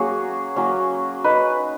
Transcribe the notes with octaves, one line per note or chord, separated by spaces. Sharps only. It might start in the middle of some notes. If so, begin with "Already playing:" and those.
Already playing: F#3 A#3 C#4 F#4 G#4
F#3 A#3 C#4
D#4 B4